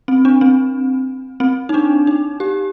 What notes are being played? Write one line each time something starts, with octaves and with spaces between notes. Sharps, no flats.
C4
D4
C4
C4
D#4
D4
D#4
G4